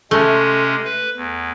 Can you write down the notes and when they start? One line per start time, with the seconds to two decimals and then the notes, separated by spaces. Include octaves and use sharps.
0.11 C3 G#3 A3 C#4
0.84 B4
1.16 E2